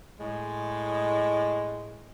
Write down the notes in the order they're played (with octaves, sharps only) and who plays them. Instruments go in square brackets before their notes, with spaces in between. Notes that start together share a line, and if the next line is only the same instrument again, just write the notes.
[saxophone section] A2 G#3